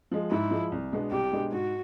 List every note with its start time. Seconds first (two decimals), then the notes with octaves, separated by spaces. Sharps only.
0.11 F3 G#3
0.31 G#2 E4
0.51 F3 G#3
0.72 C2
0.92 B2 G#3 B3 D4
1.11 C2 G4
1.32 B2 G#3 B3 D4
1.52 G#2 F#4